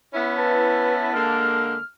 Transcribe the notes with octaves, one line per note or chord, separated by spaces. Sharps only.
B3 C#4 E4
B4 A5
D3 G#3 A#3 F6